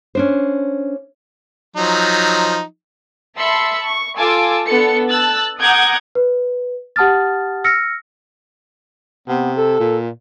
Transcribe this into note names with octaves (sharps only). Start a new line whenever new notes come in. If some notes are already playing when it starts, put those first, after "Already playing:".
C#4 D4 C5
F3 F#3 D#4
E5 A5 B5 C6 E6 C#7
C#6
F4 A4 G#5 A5 D6 E6
B3 D4 A4 C#7
A5 E6 F#6 A6
F#5 A#5 D6 D#6 G6 G#6
B4
G4 F#5 A5 D#6 F6 A6
E6 F6 A#6 C#7
C3 B3
A4
A#2